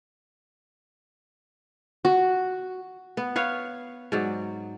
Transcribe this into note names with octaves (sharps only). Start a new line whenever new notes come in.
F#4
B3
B4 C#5 F5
G#2 F#3 D5